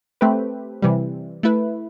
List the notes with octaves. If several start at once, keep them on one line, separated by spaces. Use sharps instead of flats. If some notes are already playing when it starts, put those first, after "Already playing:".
A3 C4 G4 B4
C3 E3 G3
A3 E4 B4